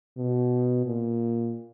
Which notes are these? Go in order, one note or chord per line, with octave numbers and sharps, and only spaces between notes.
B2
A#2